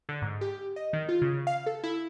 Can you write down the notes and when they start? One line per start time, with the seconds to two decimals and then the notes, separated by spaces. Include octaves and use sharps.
0.09 D3
0.22 G#2
0.41 G4
0.76 D#5
0.93 D#3
1.09 F4
1.22 C#3
1.47 F5
1.66 A4
1.84 E4